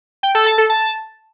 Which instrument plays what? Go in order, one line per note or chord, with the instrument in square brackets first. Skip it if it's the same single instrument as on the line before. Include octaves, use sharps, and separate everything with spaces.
[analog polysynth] G5
A4
A5
A4
A5